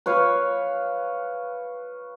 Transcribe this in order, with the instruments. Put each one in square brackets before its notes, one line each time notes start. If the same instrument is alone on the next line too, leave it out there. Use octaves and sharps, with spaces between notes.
[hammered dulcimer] B4 C#5 F5